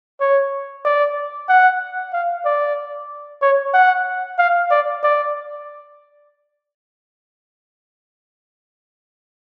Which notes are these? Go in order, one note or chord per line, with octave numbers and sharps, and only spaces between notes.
C#5
D5
F#5
F5
D5
C#5
F#5
F5
D5
D5